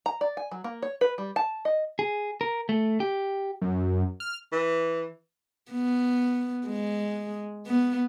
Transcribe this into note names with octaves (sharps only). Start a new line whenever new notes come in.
A#5
D5
G#5
F#3
A#3
C#5
B4
G3
A5
D#5
G#4
A#4
A3
G4
F#2
F6
E3
B3
G#3
B3